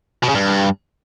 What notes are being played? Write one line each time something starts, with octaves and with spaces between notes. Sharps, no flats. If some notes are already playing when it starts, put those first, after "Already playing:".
B2
C#3
G2